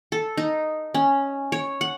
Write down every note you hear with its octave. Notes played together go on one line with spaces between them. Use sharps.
A4
D#4
C#4
C#5
F#5